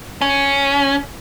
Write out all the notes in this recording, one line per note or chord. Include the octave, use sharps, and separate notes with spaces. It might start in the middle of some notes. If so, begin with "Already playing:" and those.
C#4